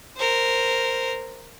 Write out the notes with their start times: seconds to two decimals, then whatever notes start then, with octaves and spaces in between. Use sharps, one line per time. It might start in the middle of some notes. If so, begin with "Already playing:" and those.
0.17 A#4 C5